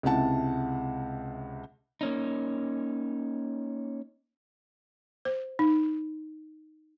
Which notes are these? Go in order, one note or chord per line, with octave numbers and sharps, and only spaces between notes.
C#2 C3 E4 F#5 A5
A#3 C#4 D#4
C5
D#4